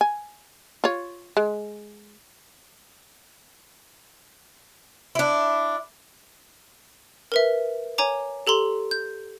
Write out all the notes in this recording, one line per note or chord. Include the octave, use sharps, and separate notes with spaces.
G#5
F4 C#5
G#3
D4 E4
A#4 B4 E5
C#5 G#5 A#5 D6
G4 A4 A#5 C6
G6